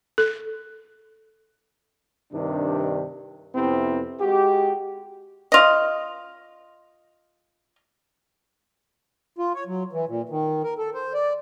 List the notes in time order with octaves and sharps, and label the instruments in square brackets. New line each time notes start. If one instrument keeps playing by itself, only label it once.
[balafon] A4
[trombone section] G2 C3 D#3 D4
F2 C3 B3 C4 E4
G#3 F#4 G4
[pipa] F4 D#5
[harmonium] F4
C#5
F#3
E3
A#2
D#3
A#4
A4
C5
D5